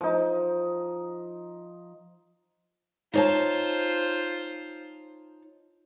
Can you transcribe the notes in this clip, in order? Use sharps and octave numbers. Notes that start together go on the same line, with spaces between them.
F3 D#4
D#4 F4 C5 C#5 A5